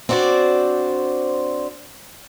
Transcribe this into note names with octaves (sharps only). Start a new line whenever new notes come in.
C4 D4 F#4 C5 D5